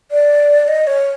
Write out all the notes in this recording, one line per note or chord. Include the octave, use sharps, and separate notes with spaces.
D5
D#5
C#5